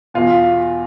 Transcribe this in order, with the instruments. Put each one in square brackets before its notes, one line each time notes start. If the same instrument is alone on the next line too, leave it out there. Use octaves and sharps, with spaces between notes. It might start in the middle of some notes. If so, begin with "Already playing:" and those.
[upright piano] E2 B2 F4